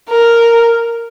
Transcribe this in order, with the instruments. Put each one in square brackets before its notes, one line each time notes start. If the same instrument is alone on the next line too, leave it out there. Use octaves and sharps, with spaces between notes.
[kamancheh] A#4